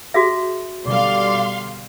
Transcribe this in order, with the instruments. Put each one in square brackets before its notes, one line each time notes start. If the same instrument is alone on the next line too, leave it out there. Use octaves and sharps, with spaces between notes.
[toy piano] F#4 G#4 E5
[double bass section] B2 D3 G3 [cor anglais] D5 [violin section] F5 C6